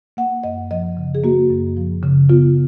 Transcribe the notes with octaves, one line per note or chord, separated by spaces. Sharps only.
A#3 F#5
F#2 D#5
F3 D#5
C#3
G#4
A#3 F#4
F#2
F3
C#3
B3 F4